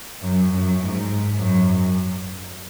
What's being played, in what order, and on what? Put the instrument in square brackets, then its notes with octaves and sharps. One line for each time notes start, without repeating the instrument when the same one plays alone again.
[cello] F#2
F#2
G#2
F#2